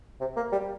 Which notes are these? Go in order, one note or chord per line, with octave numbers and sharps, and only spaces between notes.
C3
A#3
G3